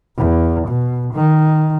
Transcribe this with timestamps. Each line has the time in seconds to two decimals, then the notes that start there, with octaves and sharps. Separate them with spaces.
0.17 E2
0.68 B2
1.14 D#3